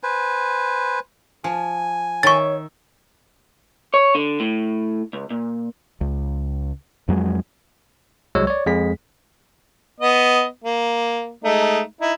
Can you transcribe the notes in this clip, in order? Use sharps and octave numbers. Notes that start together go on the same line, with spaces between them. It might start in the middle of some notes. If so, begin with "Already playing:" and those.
B4 C5 G#5
F3 G#5
D#3 C#5 E5 C#6 A6
C#5
D3
A2
C#2
A#2
C#2
F2 F#3 G#3
C2 F#3 G#3 C#5 E6
C#5 D5
F2 G#3 G#4 B6
B3 D#5
A#3
G#3 A3 D#4
D#4 E4